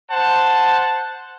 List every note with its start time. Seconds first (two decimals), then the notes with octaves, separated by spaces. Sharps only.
0.11 C5 F#5 A5